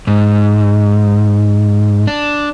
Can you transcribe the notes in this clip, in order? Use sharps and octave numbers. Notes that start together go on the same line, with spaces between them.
G#2
D4